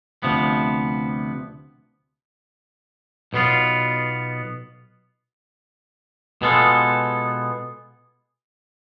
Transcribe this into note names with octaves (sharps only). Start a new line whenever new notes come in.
D2 C3 F3 B3
B1 B2 B3 F4
B2 G#3 B3 F4 A4